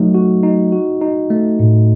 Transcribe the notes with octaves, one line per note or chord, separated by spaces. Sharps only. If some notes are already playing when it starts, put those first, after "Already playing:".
Already playing: F#3 A3 D#4 F#4
F#4
D#4
F#4
D#4
A3
A2